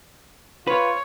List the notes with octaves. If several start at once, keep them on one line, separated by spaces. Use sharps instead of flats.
F4 B4 C#5